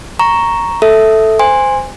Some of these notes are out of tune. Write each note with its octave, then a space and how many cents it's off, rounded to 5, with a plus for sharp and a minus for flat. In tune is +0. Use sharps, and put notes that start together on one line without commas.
A#5 +0 C#6 +0
A4 +0 E5 -10
C5 -20 G#5 -20 C6 +10